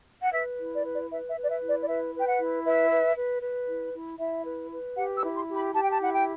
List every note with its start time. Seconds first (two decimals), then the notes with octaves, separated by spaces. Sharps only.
0.22 F#5
0.32 B4 E5
0.58 E4
0.71 D5
0.84 B4
0.92 D5
1.10 B4 E5
1.28 E5
1.35 B4
1.42 D5
1.49 E5
1.61 E4
1.68 D5
1.80 D5
1.87 B4 E5
2.13 B4 G5
2.26 F#5
2.38 E4
2.64 B4 E5
2.90 B4
3.15 B4
3.41 B4
3.67 E4
3.93 E4
4.19 E4 E5
4.44 B4
4.71 B4
4.96 G4 F#5
5.15 E6
5.22 E4
5.34 C6
5.48 G4
5.54 B5
5.73 G4 A5
5.82 G5
5.90 A5
5.99 E4 F#5
6.12 G5